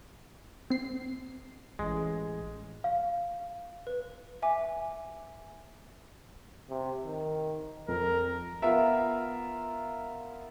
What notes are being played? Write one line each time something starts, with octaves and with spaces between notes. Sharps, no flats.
C4 C7
A1 G#3
F5
B4
E5 G#5 D6
C3
D#3
F2 A#4
B3 F4 A#4 E5